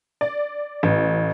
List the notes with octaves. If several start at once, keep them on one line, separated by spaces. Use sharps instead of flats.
D5
A1